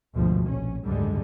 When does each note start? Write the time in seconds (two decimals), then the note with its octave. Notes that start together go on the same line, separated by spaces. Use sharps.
0.15 G#1 D2 G2 B2 D3 F3
0.46 A#1 C#4
0.85 F#1 D2 G#2 D3 G3 G#3